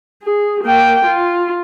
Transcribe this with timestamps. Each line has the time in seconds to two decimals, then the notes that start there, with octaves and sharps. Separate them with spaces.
0.23 G#4
0.64 A#3 G5
1.06 F4